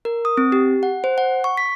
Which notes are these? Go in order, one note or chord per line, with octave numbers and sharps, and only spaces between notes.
A#4
D#6
C4
G4
F#5
C5
F#5
C#6
B6